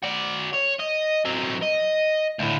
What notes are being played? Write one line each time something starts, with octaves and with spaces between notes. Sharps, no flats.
F#4 D5
C#5
D#5
F#3 C4
D#5
D2 A2